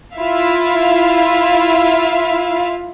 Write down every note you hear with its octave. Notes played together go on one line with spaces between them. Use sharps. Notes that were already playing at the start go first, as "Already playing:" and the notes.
E4 F4 E5 F5